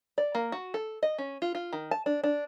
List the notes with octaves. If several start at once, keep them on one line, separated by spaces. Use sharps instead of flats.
D5
A#3
F#4
A4
D#5
C#4
F4
F4
D#3
A5
D4
D4